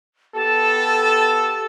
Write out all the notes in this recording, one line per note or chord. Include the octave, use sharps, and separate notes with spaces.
B3 G4 A4 A5